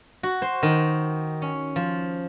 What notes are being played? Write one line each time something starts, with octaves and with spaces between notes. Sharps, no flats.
F#4
C5
D#3
C#4
F3